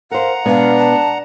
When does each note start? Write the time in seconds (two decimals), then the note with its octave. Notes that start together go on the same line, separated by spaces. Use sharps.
0.11 A#4 C5 F5 F#5 A#5
0.46 B2 G#3 B3 D4 F5
0.77 A5